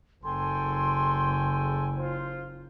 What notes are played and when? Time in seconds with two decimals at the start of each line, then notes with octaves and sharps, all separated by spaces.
0.24 F#1 A4 G5 G#5 C6
1.97 F4 C5